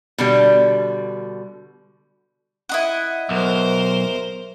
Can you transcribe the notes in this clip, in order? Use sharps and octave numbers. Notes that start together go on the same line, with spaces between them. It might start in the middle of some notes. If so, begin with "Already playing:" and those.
B2 D3 G3
E4 D#5 F#5
B1 A#4 C5